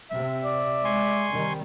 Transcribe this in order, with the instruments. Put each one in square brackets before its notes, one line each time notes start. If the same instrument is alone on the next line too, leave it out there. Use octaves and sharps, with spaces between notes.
[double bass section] C3 [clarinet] E5
[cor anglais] D5
[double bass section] G#3 [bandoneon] G#5 C6 C#6
[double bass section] C3 D#3 G3